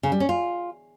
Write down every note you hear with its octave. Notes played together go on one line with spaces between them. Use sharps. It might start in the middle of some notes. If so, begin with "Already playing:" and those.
C#3
G3
C#4
F4